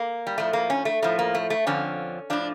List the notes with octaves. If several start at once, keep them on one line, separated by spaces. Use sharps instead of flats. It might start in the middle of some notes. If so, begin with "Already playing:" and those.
Already playing: A#3
G3
A2 F3 A3
A#3
C#4
A3
A2 F3 A3
A#3
A3
A3
F2 D3 F3 C#4
A2 F3 D4